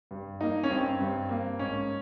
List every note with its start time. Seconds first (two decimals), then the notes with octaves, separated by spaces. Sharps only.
0.11 G2
0.41 A#3 D#4
0.63 C#4
0.70 G2 C4
1.01 G2
1.29 A#3
1.59 G#2 C#4